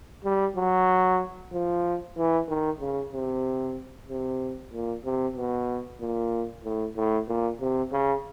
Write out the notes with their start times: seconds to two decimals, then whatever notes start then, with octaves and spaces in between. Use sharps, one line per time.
0.24 G3
0.56 F#3
1.53 F3
2.17 E3
2.48 D#3
2.80 C#3
3.13 C3
4.09 C3
4.72 A#2
5.05 C3
5.36 B2
6.01 A#2
6.64 A2
6.96 A2
7.28 A#2
7.60 C3
7.92 C#3